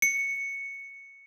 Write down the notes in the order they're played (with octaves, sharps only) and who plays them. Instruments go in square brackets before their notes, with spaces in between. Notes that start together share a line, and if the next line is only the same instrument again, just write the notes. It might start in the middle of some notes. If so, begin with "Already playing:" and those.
[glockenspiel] C#7